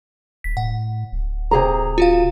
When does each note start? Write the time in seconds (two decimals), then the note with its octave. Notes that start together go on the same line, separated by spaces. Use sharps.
0.44 D#1 B6
0.57 A2 F#5
1.12 D1
1.51 C3 G#4 A#5
1.98 F4 F#4 F5